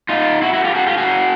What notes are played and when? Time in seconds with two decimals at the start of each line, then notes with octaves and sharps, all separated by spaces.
0.09 D#4 F4
0.42 E4 F#4
0.53 E4 F#4
0.64 F4 G4
0.75 F#4 G#4
0.87 F4 G4
0.97 F#4 G#4